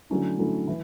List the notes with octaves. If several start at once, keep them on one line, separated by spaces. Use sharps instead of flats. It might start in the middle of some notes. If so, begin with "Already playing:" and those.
D3 F#3 A3 C#4 E4
D3 F#3 A3 C#4 E4
E3